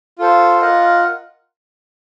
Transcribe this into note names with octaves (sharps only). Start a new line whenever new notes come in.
F4 A4 C5
F4 A#4 D#5 F#5